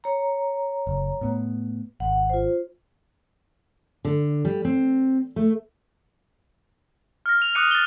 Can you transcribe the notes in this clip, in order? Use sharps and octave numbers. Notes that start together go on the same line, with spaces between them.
C#5 A#5
F#1
A2 B3
G#1 F#5
F4 C5
D3
G3
C4
A3
F6 A#6
F7
D6 D#6 F6 F#6 C#7 D#7
A6 G7